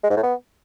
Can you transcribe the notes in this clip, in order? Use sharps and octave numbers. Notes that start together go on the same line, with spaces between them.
G#3
G#2
A2
B3